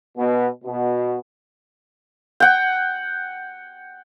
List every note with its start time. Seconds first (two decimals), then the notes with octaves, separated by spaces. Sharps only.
0.18 B2
0.64 B2
2.40 F#5 G5